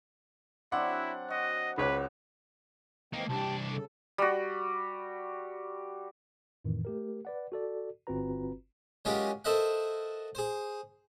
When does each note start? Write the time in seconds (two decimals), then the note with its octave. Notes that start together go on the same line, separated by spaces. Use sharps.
0.72 F#3 C4 D4 E4 F#5
1.30 F#4 D#5
1.78 C#2 B4 C#5 D6
3.14 E3 G#3 A#3 C4 D#4
3.29 C2 D4 G4 A5
3.73 C#3 A4
4.18 G3 F#4
6.65 F2 A2 D#3 E3
6.85 A3 G4 A#4
7.25 B4 D5 F#5
7.52 F#4 A4 D5
8.07 G1 C4 F4 F#4 B4 A#5
9.05 F#3 G#3 C#4 F4 G4 A#4
9.45 A4 A#4 C5 D#5 E5 F#5
10.35 G#4 C5